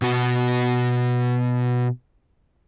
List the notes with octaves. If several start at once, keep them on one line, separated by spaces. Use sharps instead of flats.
B2 F#4